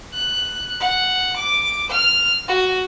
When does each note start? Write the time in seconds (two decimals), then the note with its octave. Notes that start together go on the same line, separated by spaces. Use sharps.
0.13 F#6
0.80 F#5
1.38 D6
1.91 F6
2.48 F#4